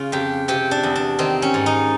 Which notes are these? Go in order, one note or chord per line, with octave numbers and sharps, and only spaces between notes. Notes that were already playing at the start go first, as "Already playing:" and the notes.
Already playing: C#3 F4
F2 G4
C3 G4
D4
E2
D4
D#3 C4
C#4
G#2
D#4